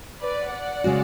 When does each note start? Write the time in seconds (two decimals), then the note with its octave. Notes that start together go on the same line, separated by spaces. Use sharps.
0.21 B4 D5
0.53 D5 F#5
0.84 C#3 G#3 C#4 F#4